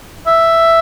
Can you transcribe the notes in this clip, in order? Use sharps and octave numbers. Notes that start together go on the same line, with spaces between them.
E5